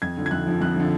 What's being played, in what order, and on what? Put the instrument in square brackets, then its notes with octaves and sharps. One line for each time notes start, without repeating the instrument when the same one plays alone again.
[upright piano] F2 G#6
D3 F3
G#6
F2 F#6
D3 F3
F2 F#6
D3 F3